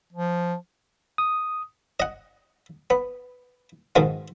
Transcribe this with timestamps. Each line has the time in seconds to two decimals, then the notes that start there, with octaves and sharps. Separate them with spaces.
0.13 F3
1.18 D#6
2.00 D#5 F#5
2.90 B3
3.96 G#2 B2 D#3 F3 G#3